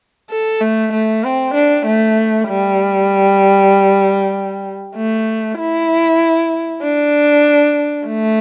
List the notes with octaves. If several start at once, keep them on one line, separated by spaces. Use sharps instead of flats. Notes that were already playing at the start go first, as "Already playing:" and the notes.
A4
A3
A3
C4
D4
A3
G3
A3
E4
D4
A3